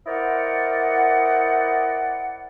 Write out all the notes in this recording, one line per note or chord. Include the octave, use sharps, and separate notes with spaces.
E4 A#4 C5 D5 D#5 F#5